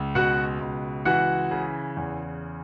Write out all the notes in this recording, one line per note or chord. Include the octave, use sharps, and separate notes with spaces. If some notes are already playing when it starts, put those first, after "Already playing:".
Already playing: C#2
B2 F#4 F#5
C#2
E3 F#4 F#5
C#3
E2